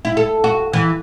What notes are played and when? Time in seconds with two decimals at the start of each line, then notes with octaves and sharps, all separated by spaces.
0.05 E4
0.17 A4
0.44 F#4
0.73 E3